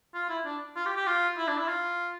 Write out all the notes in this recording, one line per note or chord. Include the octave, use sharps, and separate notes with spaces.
F4
E4
D4
F4
G4
G4
F4
E4
D4
E4
F4